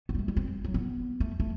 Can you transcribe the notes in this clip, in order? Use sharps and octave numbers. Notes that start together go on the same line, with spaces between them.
B3
G3
A3
G3
C4
F#3
B3
A3
A3